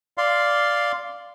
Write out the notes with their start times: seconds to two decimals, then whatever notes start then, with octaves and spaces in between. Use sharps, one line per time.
0.18 D5 F5 C6